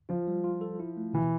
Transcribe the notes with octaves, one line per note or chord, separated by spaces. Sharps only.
F3 F4
G3
F4
A4
E4
A3
B2 E3